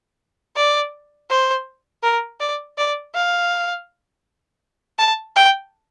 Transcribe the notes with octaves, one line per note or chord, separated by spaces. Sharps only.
D5
C5
A#4
D5
D5
F5
A5
G5